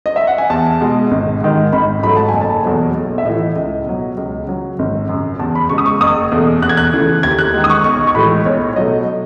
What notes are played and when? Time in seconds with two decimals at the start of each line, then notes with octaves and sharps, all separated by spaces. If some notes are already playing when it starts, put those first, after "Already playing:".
0.06 D#5
0.16 E5
0.27 F#5
0.38 G#5
0.50 E2 A5
0.81 B2 G#3
1.11 G#1
1.41 G#2 D#3 G#3
1.72 G#1 B5
2.03 G#2 F#3 A3 B5
2.16 A5
2.29 F#1 G#5
2.41 A5
2.64 E2 B2 F#3 A3
2.95 B1
3.18 E5
3.25 A2 E3 D#5
3.56 C#2 D#5
3.86 B2 F#3
4.17 C#2
4.47 C#3 F#3
4.79 G#1
5.09 F#2 C#3
5.39 E2 A5
5.55 B5
5.70 C#3 G#3 C#6
5.78 D#6
5.86 C#6
6.00 F#1 D#6
6.32 E2 B2 A3
6.62 E2 F#6
6.69 G#6
6.77 F#6
6.93 C#3 E3 A3
7.23 D#2 G#6
7.39 F#6
7.54 D#3 G#3
7.64 D#6
7.70 C#6
7.84 B1 C#6
8.07 C#6
8.15 A2 E3 G#3 B5
8.45 B1 C#5
8.76 B2 F#3 A3 D#5